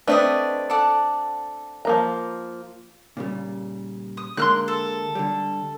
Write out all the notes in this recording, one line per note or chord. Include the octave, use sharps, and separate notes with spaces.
A3 C4 D4 B4 D5 D#5
A4 D5 F#5
F3 A#3 A#5
A#2 C#3 G3
D#6
D3 G#3 A#3 C6 F6 F#6
A4
D3 G3